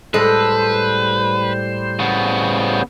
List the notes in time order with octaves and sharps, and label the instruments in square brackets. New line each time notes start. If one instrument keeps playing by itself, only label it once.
[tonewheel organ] A2 G3 C5 [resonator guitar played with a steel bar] G#3 A4 [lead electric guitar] B4
[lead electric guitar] C#3 B3